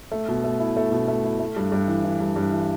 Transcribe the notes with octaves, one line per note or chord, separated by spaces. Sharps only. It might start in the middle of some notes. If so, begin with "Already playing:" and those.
A3
B2
A3
E4
A3
B2
A3
E4
A3
G2
G2
E3
E3
G2
G2
E3